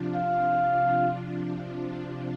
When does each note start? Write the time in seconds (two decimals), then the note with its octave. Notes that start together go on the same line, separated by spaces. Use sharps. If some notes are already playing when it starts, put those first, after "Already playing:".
Already playing: C3 F3 D4 F4
0.16 F5